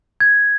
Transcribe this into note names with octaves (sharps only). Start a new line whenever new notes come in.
G#6